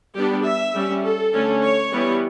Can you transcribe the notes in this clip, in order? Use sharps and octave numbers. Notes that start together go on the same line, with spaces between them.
G3 B3 D4 G4
E5
G3 C#4
A4
D3 A3 C#4
C#5
E3 G3 B3